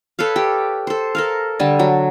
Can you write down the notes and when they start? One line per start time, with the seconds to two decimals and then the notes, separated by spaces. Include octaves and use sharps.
0.19 A4 B4 C#5 F5
0.36 G4
0.87 A4 C5
1.15 A4 A#4 F5
1.59 D3 G3 G#5 A5
1.79 F#3